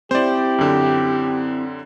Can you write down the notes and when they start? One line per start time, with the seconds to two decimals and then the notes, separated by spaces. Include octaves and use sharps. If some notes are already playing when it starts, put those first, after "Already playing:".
0.11 C4 E4 G4 C5 D5
0.58 F#2 D3